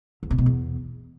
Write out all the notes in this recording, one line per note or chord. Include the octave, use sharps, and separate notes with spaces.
E2
C3
B2
E2